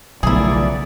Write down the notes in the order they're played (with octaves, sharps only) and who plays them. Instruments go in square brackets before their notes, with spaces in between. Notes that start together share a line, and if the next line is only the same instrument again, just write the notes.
[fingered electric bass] B1 A3 [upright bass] C#3 F3 [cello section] B3 D5 [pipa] E4 G#4